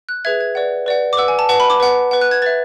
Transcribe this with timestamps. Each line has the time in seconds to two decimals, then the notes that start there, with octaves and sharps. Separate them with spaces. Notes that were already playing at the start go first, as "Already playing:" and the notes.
0.09 F#6
0.25 G#4 B4 E5 G#6
0.41 G#6
0.55 B4 D5 F#5
0.86 B4 D5 F#5
1.13 D6
1.17 B4 F#5 E6
1.28 G#5
1.39 A5
1.49 B4 F#5 A5
1.60 B5
1.70 D6
1.80 B4 F#5
2.11 B4 F#5
2.21 F#6
2.31 G#6
2.42 B4 E5 A6